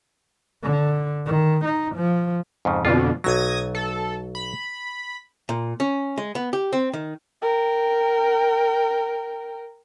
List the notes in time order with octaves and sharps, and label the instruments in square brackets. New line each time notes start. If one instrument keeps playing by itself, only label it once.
[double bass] D3
D#3
D#4
F3
[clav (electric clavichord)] F2 G#2 C#3
[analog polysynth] F2 B2 D3 [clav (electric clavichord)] F4
[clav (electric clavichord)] B1 F#3 [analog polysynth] D#6 G#6 A#6
[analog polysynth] A4
B5
[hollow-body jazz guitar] A#2
C#4
G#3
B3
G4
C4
D#3
[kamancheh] A#4 G5